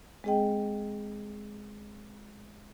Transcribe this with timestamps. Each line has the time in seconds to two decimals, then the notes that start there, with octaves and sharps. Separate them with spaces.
0.24 G#3 C4 G#4 D#5 G5